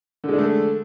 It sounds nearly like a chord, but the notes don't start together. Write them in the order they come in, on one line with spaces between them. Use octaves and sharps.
D3 G#3 D4 A3